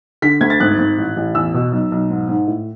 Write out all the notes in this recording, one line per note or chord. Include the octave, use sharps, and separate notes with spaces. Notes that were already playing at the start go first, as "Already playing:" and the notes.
D3 B6
D2 G#6
A6
G#1 F#6
G#1
A1
A1
E2 E6
B2
B1
B1
G#2
G#2
A2